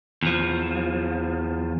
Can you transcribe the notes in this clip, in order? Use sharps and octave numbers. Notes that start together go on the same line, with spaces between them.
E2 F3